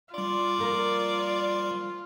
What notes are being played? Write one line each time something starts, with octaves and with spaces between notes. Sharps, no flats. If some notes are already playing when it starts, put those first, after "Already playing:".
G3 F4 D5 C6
F3 A#3 A#4